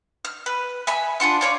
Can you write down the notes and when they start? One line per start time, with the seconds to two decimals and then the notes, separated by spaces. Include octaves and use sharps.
0.25 F6
0.46 B4
0.87 E5 G#5 B5
1.20 D4 F4 F#5 C6
1.41 F4 C#5 D5